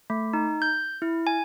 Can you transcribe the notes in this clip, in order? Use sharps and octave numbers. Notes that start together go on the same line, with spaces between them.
A3
D#4
G6
E4
G#5